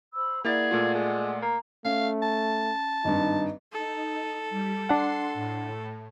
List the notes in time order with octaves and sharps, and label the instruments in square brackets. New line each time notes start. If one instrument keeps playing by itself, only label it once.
[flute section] C5 B5 E6
[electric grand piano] A#3 E4 A6 [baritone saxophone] G#4 [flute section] D5 F#5
[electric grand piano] A#2 A3 F4
[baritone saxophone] G#3
[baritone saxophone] A#3 [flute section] A#5
[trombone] A3 [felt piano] C#4 [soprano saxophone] F5
[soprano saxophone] A5
[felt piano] G#1 G2 [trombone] D#4
[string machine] D#4 [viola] A4
[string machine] G3
[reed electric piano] D4 F#5 [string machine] C6 C7
[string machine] A2